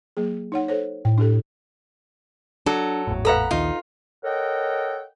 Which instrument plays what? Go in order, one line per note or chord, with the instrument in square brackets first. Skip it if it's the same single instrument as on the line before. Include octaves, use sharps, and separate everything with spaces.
[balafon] F#3 A#3 G#4
D#4 C#5 F#5
A4 C5 C#5
[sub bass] A2 [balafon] G5
[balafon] D4 G4 A4
[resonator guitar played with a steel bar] F#3 [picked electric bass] D4 [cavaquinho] A4
[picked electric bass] G#1 E2 A2
[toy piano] A4 B4 F5 [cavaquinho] F#5 A#5 B5
[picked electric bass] A#1 D#2 D#3 [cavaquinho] D#4 [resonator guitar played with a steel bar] F4
[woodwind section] A4 A#4 C#5 D#5 F#5 G5